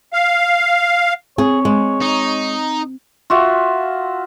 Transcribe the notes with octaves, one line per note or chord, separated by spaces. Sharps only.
F5
C4 G#4 C#5
G#3
D#4
F4 F#4 E5